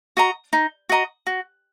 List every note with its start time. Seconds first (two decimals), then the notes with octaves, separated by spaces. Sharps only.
0.17 F#4 D#5 A#5
0.53 D#4
0.89 F#4 D#5 A#5
1.27 F#4